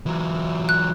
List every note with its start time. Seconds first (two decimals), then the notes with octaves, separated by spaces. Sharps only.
0.06 E3 F#3
0.69 F#6